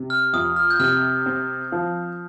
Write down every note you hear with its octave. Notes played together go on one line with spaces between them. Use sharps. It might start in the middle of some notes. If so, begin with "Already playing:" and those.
Already playing: C3
F6
F2 D#6
F6
G6
C3 F6
C4
F3